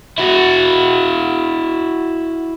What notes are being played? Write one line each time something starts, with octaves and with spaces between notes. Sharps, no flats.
E4 F#4